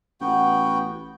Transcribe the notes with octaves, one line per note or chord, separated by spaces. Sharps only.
A1 B3 F#4 G5